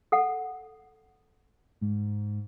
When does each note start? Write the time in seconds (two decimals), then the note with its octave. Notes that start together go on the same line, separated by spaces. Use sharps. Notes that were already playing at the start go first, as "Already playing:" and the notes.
0.12 A4 F#5
1.81 G#2